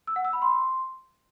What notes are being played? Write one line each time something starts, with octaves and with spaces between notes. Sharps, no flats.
E6
F#5
E6
B5
C6